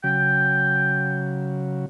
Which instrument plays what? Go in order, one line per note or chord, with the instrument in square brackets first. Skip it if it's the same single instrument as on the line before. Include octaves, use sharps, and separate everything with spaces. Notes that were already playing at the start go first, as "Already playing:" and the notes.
[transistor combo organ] C#3 F#3 [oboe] G5